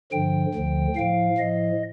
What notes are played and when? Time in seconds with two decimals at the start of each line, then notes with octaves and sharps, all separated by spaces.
0.12 G2 D3 F3 G5
0.54 D2 D3 F3
0.96 A2 F3 F5
1.38 A2 F3 D#5